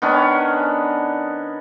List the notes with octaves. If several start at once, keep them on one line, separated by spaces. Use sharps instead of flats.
D#3 B3 C#4 D4